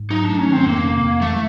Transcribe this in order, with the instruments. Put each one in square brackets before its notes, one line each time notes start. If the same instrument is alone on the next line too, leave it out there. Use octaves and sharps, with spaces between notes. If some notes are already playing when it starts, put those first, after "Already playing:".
Already playing: [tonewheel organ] G#2
[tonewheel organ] F#3 [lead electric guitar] D#4
[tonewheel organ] A3 [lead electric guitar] D4
[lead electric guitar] C#4
[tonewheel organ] D#3 [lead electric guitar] C4
[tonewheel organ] F2 [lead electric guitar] A#3
[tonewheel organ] C3
F2
[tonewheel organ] E3 [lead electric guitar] A3